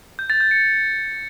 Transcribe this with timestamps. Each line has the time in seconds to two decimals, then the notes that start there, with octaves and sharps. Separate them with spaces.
0.19 G6
0.30 A6
0.40 G6
0.51 C#7